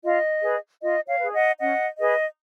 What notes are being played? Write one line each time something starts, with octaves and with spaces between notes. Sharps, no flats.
F4 D#5
G#4 B4
F4 D#5
C#5 F5
G#4 B4
D#5 F#5
C#4 D#5 F#5
G#4 B4 D#5